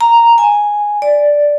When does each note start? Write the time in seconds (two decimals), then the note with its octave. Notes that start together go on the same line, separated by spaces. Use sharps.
0.01 A#5
0.38 G#5
1.02 D5